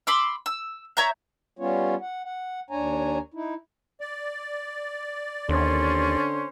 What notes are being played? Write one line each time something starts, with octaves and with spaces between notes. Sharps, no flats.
B5 C6 D6 E6
E6
C#5 E5 A#5 G6
G3 B3 C#4 F4 C#5
F#5
F#5
D#2 D4 C#5 G#5 A#5
D#4 E4
D5
D#2 D3 C#4 C5 C6